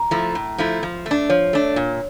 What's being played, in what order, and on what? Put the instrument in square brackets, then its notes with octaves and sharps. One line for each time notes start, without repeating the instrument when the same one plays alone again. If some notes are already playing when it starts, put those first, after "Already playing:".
Already playing: [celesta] A#5
[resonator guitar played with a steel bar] F3 A3 E4
A2
F3 A3 E4
F3
A3
D4
[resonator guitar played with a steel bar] F3 [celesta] C#5
[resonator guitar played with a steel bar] A3 D4
A#2